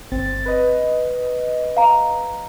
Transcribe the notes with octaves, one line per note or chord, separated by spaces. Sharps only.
G1 C4 A6
B4 D#5
F5 A#5